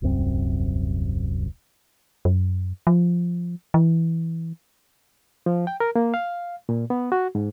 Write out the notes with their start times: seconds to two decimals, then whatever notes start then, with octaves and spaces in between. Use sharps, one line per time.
0.02 D#1 C2 F#2 C4
2.25 F#2
2.87 F3
3.74 E3
5.46 F3
5.67 G5
5.80 A#4
5.96 A#3
6.14 F5
6.69 A#2
6.90 B3
7.12 F#4
7.35 G#2